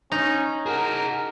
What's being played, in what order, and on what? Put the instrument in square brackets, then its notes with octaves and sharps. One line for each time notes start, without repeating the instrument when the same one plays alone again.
[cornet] C#4 [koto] D#4
[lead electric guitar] F#4 G#4 [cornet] A#4